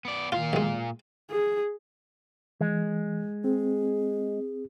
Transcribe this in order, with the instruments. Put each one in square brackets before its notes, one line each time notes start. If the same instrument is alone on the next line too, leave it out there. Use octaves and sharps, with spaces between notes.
[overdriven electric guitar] B3 D5
[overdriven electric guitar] A#2 F5 [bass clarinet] D#3 [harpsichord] F4
[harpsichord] B1 G#3
[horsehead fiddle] G#4
[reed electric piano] E3 [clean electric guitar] G#3
[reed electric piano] C4 [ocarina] G#4